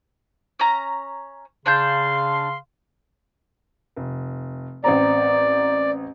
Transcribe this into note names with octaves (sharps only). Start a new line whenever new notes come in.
C#4 A#5
C#3 D4 F5 A5 C6 G6
F1
A1 C4 D5 A#5